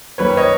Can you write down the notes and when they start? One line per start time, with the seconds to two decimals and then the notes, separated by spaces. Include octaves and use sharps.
0.18 F#2 D#3 G3 A#3 B4 C#5
0.37 C#5 D#5